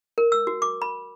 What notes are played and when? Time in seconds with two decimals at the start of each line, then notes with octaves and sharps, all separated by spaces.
0.18 A#4
0.32 E6
0.47 F#4
0.62 D6
0.82 B5